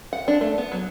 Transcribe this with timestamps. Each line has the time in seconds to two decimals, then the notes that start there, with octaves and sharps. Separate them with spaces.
0.13 F#5
0.28 D4
0.41 A3
0.58 B3
0.72 F#3